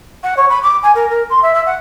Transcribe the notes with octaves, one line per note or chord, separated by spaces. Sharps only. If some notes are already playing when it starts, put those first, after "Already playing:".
F#5
C#5
B5
D6
G#5
A#4
A#4
C6
E5
E5
F#5